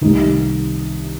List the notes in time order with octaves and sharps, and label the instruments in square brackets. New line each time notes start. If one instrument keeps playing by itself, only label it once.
[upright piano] C2 C3 D#3 D#4